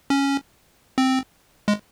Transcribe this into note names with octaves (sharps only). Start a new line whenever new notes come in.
C#4
C4
G#3